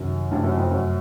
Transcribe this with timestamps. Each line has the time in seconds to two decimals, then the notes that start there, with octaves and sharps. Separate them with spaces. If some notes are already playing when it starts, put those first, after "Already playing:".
Already playing: C2 F#2 C3 D#3
0.31 G2 C3 F3 A3 C#4
0.44 F#2
0.57 F2
0.71 F#2